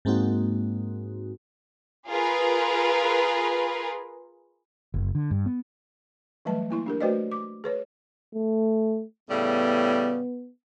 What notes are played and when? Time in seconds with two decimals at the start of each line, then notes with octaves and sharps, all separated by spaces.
0.05 G#2 G#3 A#3 C4 D#4 F#4
2.09 F4 G#4 A#4 B4
4.94 F#1
5.15 D3
5.31 G2
5.46 B3
6.45 E3 F#3 G3 A3 B4 A5
6.70 A#3 E4 C6
6.86 D4 G4 A#4
7.01 A3 F#4 B4 C5 D5 D#5
7.32 D6
7.64 G#4 B4 C#5
8.35 A3
9.31 A2 C#3 G3 B3